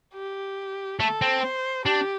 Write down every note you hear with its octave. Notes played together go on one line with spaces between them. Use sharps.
G4
A3 A4
C4
C5
D4 G4